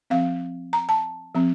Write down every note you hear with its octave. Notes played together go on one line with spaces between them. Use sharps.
F3 C4 F5
A#5
A5
F3 C4